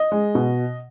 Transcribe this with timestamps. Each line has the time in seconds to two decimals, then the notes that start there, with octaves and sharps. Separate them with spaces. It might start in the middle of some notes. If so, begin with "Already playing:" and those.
Already playing: D#5
0.12 G#3
0.35 B2